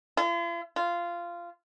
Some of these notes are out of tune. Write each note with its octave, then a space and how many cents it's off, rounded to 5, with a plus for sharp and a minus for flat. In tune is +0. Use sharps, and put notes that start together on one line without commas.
F4 -45
F4 -15